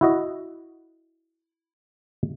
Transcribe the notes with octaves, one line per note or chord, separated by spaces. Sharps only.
E4 F#4 D#5